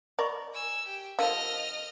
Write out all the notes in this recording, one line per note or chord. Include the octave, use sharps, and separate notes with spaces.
A#4 D5 D#5 B5 C#6
G#5 E6
G4
D3 F3 A#4 D#5 F5 F6